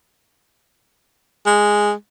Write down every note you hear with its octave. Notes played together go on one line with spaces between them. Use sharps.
G#3